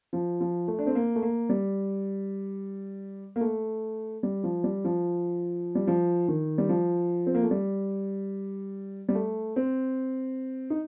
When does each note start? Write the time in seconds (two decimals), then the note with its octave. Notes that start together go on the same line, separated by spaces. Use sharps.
0.13 F3
0.40 F3
0.68 A3
0.79 D4
0.87 C4
0.95 A#3
1.16 A3
1.22 A#3
1.50 G3
3.36 A#3
3.41 A3
4.23 G3
4.44 F3
4.64 G3
4.84 F3
5.75 G3
5.87 F3
6.28 D#3
6.58 G3
6.69 F3
7.26 C4
7.35 A#3
7.43 A3
7.51 G3
9.09 G3
9.15 A3
9.56 C4
10.70 D#4